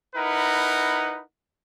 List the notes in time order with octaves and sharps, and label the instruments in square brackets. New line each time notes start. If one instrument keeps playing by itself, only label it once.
[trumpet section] D#4 E4 A#4 B4 F#5